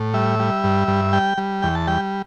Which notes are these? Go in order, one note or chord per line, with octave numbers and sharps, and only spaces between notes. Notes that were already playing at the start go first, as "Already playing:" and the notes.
Already playing: A2
G3 E5
G3
G2
G2
G3 G5
G3
E2 G5
A5
G3 G5